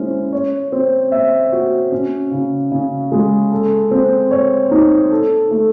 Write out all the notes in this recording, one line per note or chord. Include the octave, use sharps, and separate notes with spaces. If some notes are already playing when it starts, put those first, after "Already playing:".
Already playing: G#3 C#4 E4 C5
C#5
C4
E5
F#4
C#4
C#3
C#3
G#3
A4
C4
C#5
D#4
A4
A3